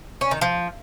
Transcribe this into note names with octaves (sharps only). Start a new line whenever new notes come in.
C#4
D#3
F3